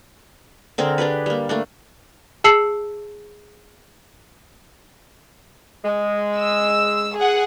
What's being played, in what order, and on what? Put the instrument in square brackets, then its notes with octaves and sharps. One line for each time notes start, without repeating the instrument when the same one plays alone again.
[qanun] D3 C4 G#4 A#4
D4 G4 G#4 B4
G3 A#3
A3 A#3 D4
[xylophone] G#4 A5 E6 C7 C#7 F#7
[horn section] G#3
[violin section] E6
G#4 F#5